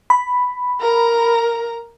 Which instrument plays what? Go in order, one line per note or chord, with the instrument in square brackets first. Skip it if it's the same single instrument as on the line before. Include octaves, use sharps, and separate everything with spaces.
[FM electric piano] B5
[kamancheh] A#4 A#5